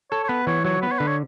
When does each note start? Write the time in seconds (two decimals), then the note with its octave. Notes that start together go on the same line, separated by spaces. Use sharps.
0.11 A4 C#5
0.24 C#5
0.29 B3 B4
0.47 E3 C#5
0.64 F#3 C#5
0.82 B3 B4
0.91 C#5
0.99 D3 B4
1.08 C#5